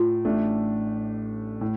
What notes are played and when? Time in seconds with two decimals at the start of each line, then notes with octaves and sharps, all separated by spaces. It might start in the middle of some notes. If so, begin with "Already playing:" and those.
Already playing: A2 F4
0.25 A1 A2 A3 D4
1.61 A2